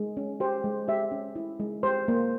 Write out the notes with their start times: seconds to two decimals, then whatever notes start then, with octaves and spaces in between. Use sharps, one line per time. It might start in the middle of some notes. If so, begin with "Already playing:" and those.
Already playing: G#3
0.17 C#4
0.40 G4 C5
0.64 G#3
0.88 G4 E5
1.12 C#4
1.36 E4
1.60 G#3
1.83 G4 C5
2.08 A#3